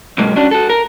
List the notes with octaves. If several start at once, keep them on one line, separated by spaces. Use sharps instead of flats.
F#2 B2 F#3 G#3 A#3
C#4 D4 F#4
F#4 A4
A#4